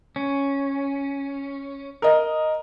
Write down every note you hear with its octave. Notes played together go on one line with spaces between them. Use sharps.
C#4
A#4 D#5